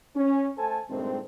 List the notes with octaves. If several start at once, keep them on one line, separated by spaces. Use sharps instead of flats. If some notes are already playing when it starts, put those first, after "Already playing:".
C#4
A3 A4 C5 G#5 A5
G2 A#2 D#3 G#3 A3 C4